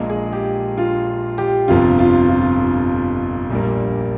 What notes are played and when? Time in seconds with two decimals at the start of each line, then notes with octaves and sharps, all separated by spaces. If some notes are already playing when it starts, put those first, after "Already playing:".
Already playing: A#1 A#2 G#3
0.10 G#4
0.33 G4
0.78 F4
1.38 G4
1.68 G1 F2 C3 F4
1.99 F4
2.29 F4
2.60 F4
3.50 A#1 A#2 G3 A#3